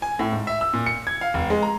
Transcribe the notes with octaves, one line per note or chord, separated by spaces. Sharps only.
G#5
A2
G#2
E5
E6
A#2
C#7
G#6
F5
F1
G#3
A#5